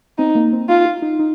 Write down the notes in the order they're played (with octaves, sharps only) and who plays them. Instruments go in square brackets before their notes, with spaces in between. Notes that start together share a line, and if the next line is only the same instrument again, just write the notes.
[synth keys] C4 [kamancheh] D#4
[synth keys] A#3
C4
[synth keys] D#4 [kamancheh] F4
[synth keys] F4
D#4
D#4